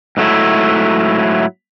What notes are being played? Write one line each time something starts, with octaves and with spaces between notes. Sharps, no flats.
G#2 F#3 A3 E4